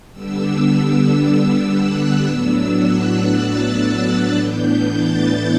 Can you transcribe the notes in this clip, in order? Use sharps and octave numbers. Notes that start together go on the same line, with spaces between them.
D3 G3 B3 D4 E6
F#6
A2 F#3 B3 D4 E6
F#6
A6
A6
A2 E3 B3 D4 G6
A6